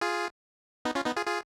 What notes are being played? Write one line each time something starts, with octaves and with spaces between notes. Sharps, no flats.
F4 G#4
B3 D#4
C#4 F4
B3 D#4
F4 G#4
F4 G#4